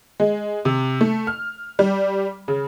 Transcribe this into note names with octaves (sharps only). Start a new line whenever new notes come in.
G#3
C3
A3
F6
G3
C#3